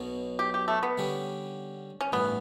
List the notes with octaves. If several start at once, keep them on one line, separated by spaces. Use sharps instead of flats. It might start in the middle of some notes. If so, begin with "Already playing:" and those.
Already playing: B1 B2 F#3
G4
G4
A3
B3
D3 G3 C#4 G4
C#4
A1 G2 E3 B3